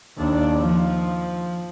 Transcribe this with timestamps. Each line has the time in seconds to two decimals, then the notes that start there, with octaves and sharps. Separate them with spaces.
0.17 D#2 D4
0.60 F3